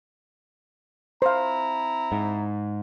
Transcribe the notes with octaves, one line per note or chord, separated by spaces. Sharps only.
C4 E4 C5 F5 A#5
G#2